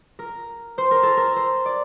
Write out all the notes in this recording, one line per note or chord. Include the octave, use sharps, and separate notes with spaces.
A#4
C5
A#4
A4
A#4
C5
D5